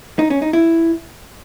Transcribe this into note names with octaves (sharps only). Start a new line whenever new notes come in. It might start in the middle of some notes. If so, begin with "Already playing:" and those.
D#4
C#4
D#4
E4